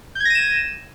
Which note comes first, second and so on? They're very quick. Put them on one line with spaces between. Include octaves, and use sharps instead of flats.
G6 G#6 A#6 D#7 E7